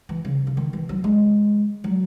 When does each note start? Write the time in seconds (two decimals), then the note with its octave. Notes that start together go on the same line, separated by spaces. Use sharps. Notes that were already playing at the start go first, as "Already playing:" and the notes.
0.09 E3
0.25 C#3
0.47 C#3
0.57 D#3
0.73 E3
0.89 F#3
1.04 G#3
1.84 F#3